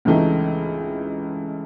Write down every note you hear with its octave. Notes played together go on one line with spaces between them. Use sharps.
C#2 C#3 E3 A3 D#4